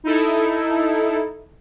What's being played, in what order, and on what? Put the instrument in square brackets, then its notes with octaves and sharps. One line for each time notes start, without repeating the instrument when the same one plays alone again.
[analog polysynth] D#4 E4 A4